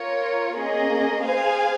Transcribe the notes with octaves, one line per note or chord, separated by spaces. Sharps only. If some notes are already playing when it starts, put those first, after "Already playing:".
Already playing: F4 A#4 C#5
A#3 C#4 G#4 D#5
G#4 C5 F5 G#5